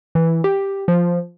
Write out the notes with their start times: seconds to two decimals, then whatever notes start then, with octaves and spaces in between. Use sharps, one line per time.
0.15 E3
0.44 G4
0.88 F3